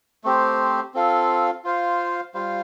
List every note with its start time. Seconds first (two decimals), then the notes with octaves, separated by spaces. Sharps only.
0.24 A3 C4 G4 C5
0.94 C4 F4 A4 F5
1.64 F4 C5 F5
2.34 G3 F4 C5 F5